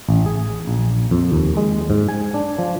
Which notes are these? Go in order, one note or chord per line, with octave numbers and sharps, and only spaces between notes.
A1
G#4
A#1
F2
D#2
G#3
G#2
G#5
D4
F3